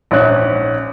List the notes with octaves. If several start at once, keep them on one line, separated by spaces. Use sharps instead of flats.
A#1 G#2 C#4 F#6